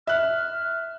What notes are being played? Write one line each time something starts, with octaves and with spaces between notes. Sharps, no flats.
E5 F6 F#6